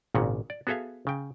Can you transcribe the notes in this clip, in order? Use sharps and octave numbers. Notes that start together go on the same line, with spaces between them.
G#1 A#2 C#3 F#5
D5
B3 F#4 G#4 A4 E5 F5
C#3 G5